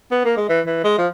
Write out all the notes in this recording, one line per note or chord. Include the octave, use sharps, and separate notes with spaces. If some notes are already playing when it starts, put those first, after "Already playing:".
B3
A#3
G#3
E3
E3
G#3
F3